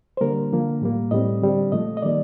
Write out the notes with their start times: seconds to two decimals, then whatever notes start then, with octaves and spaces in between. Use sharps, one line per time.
0.17 C5
0.21 D3 G3 A#3 A#4
0.52 D3 F3 A#3
0.82 A2 G3 A#3
1.11 A2 G3 C4 D#5
1.42 D3 G3 C4
1.72 A#2 F3 A3 D#5
1.97 D#5
2.02 D#3 G3 A#3 D5